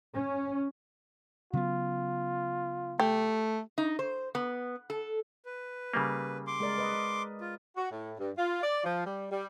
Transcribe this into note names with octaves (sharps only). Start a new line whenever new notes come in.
C#4
C#3 F#3 B3 F4
A3 G4
D#4
C5
B3
A4
B4
C#3 G3 A#3
C6 D6
G#3 A#4 D5
B4 D#5
F4
F#4
A2
G2
F4
D5
F3
G3
G3